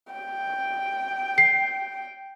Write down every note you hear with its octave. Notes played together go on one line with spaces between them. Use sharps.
G5
C7